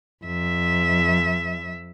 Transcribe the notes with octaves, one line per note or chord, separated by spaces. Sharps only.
F2 E5